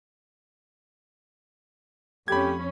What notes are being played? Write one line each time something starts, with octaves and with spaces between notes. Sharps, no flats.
F2 A3 C#4 G4 B5 G#6